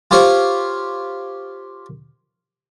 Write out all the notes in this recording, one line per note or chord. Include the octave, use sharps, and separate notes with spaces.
F4 G4 C5 C#5 F5